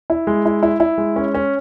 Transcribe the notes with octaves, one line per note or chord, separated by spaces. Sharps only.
E4
G#3
E4
E4
E4
G#3
C#4
C#4